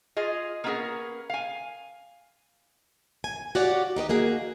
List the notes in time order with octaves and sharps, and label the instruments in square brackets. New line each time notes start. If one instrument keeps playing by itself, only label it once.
[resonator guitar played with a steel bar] F4 G#4 D#5
A#3 B3 C#4 E4 G#4 A#4
F5 G#5
[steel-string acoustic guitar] G#5
F#4 G4 C#5 D5 F5 F#5
D#4 G4 B4 D#5
A#3 F#4 G#4